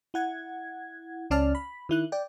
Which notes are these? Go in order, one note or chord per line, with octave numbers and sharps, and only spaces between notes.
E4 F#5 G#6
C#2 C#4 D5 A5 F6
B5
D#3 E4 F#6
D5 G5